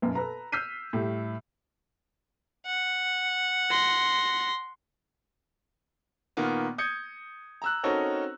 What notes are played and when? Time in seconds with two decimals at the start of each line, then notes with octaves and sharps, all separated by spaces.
0.02 B1 F#2 B2
0.15 A4 B4 A#5
0.52 E6 F6 G6 B6 C7 D#7
0.93 A2 G3
2.66 F#5
3.71 C6 A#6
6.37 A#2 D#3 A#3 B3
6.78 D#6 G6 G#6 C#7
7.62 A#5 E6 F#6
7.83 C4 C#4 D#4 F#4 A4 A#4